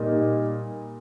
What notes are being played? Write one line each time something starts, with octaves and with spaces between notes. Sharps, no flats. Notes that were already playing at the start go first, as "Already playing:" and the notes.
Already playing: A#2 G3 A#3 D#4